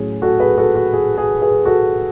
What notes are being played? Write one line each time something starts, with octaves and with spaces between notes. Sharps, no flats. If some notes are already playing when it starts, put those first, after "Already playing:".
Already playing: A2 F#3 C#4 G#4
F#4 A4
G#4 B4
F#4 A4
F#4
G#4
G#4
G#4 B4
F#4 A4